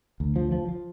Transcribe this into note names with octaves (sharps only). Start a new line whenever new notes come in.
D2
F3
F3
F3